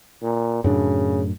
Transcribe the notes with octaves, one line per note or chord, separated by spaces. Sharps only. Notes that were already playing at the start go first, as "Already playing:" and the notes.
A#2
F#2 A2 C#3 D4